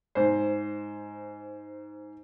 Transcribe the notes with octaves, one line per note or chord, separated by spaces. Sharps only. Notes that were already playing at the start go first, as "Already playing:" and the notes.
G#2 C5